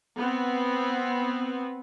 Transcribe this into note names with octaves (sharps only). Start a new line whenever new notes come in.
B3 C4